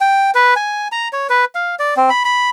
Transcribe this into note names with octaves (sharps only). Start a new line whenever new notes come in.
G5
B4
G#5
A#5
C#5
B4
F5
D5
C4
B5
B5